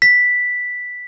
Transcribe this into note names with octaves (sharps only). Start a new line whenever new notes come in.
B6